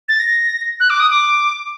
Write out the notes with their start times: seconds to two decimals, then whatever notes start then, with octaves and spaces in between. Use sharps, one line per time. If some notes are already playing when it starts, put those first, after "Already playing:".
0.09 A6
0.20 A#6
0.80 F#6
0.90 D6
1.00 D#6
1.10 D6